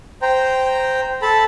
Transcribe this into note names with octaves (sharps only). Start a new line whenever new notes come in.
C5 G5 A#5
A4 A5 B5